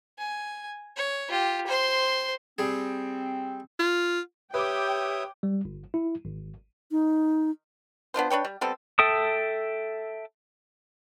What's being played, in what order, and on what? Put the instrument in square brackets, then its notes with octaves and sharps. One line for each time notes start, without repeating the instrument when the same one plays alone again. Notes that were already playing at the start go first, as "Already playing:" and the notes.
[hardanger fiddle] G#5
C#5
F4 G4
C5 C6
[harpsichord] G3 G#4 [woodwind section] C4
[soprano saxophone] F4
[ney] G4 [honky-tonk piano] B4 D6 [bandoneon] C#5 E5 D#6 [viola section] G5
[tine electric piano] G3
G1
E4
G#1
[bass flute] D#4
[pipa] B3 D4 F4 C5
D4 B4 C#5 G5
G3
G3 B3 C4 A4
[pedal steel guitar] A4 E5 G5 A5 D#6